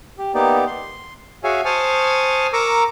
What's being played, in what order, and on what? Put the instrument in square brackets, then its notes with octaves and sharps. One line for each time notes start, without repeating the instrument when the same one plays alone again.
[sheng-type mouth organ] G4
A#3 B3 D#4 G4 D5
C6
F#4 G#4 C#5 E5 F5 G#5
C5 G#5 A5 C#6 D#6 F6
A#4 A#5 C#6 D6 E6